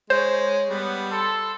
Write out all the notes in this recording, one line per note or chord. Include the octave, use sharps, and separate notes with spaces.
G#3 C5 C#5
G3 B3
A4 C6